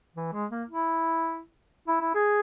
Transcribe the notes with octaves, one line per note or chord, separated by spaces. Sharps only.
E3
G#3
A#3
E4
E4
E4
G#4